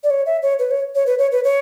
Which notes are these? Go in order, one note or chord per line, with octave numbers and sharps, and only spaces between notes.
D5
C#5
E5
C#5
B4
C#5
C#5
B4
C#5
B4
C#5